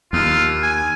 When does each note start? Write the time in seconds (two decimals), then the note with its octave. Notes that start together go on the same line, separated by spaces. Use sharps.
0.13 D#2 F4
0.63 G#5